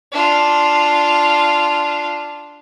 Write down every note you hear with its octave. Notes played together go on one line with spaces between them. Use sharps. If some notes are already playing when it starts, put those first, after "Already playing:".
D4 F4